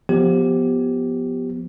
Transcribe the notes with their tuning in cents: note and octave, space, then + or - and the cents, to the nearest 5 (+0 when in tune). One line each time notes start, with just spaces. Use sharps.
F3 +15 B3 +0 G4 +0